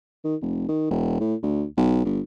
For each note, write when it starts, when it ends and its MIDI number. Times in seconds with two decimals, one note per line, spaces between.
0.24 0.36 51
0.42 0.67 29
0.68 0.88 51
0.90 1.19 28
1.20 1.35 45
1.42 1.64 38
1.77 2.02 35
2.05 2.20 31